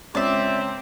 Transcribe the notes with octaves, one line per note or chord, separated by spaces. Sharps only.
C#2 C4 C#5 D5 E5